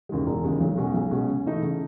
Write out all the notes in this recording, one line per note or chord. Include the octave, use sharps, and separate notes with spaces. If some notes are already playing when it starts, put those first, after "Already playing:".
D#2 C#3 E3 G#3
E1
D#2 C#3 E3 G#3
B1
B2 G#3 C#4 G#4
B1
B2 G#3 C#4 G#4
C#3
E3 A3 D#4
C#3